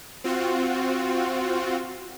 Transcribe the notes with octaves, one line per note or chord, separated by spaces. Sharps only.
C4 F4 F#4